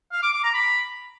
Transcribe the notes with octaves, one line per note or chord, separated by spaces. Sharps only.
F5
D6
D6
A#5
B5